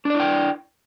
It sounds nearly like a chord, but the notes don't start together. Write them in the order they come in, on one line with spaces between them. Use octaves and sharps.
D4 D5 E4 G5